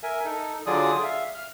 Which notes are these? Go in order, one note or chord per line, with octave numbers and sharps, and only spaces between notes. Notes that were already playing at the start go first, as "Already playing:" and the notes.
A#4 E5 G#5
D#4 A4
D3 F#3 F4 G#4 D5 D#6
E5 F5
F6